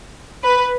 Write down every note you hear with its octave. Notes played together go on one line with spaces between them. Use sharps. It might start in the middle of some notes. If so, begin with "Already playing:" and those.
B4